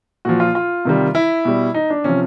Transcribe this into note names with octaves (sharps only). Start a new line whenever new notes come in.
A#2 F3 F#4
F4
F4
C3 D#3 G3
E4
B2 G3
D#4
D4
C3 F3 C#4